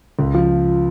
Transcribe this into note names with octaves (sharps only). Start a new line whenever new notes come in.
C#2
F3